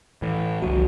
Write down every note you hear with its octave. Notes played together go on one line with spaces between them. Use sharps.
A2 E3
G1 C2 F3 F#4